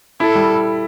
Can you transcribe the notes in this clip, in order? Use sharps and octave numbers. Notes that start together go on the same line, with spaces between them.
E4 A4
G3